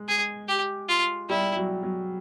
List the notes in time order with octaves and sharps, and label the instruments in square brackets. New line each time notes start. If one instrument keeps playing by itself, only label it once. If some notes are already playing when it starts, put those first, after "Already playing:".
Already playing: [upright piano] G#3
[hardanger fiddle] G#4
G4
F4
[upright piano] G3 [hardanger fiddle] E4
[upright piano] F#3
F#3